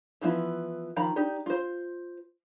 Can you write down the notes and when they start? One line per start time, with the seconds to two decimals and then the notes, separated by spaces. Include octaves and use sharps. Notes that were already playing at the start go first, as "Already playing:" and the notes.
0.21 E3 F3 B3 E4
0.96 D#3 F3 A#5 B5
1.16 D4 D#4 G4
1.46 F4 C5